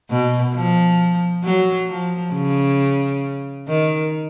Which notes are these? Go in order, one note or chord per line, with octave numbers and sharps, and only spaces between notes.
B2
F3
F#3
F3
C#3
D#3